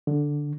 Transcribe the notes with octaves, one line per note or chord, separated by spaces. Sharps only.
D3